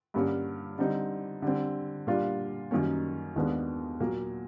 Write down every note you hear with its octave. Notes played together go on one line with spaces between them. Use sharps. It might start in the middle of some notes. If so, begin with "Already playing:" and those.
G2 D3 G3 A#3 C#4
D3 G3 C4 D#4
D3 G3 C4
A#2 G3 A#3 D4 F4
F#2 D#3 G3 A#3 C#4
D#2 D#3 G#3 B3 D4
A#2 F#3 A#3